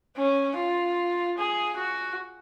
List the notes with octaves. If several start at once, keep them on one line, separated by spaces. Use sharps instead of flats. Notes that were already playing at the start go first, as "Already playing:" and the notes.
C#4
F4
G#4
F#4